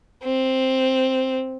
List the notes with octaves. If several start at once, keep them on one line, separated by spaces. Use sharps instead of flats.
C4